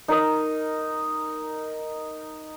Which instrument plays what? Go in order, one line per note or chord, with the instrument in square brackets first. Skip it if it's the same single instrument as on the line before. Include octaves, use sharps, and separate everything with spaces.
[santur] D#4 A#4 D#5